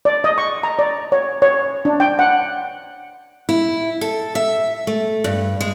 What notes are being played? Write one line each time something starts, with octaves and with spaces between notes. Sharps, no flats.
D5
D#5
C#6
A#5
D5
C#5
C#5
D4
G5
F#5
E4
A4
E5
A3
G2
G#3